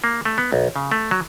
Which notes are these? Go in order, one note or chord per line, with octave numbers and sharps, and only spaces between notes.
A#3
A3
B3
B1
C#3
A3
F#3